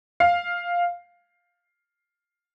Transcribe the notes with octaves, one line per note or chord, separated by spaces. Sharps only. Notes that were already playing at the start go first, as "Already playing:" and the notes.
F5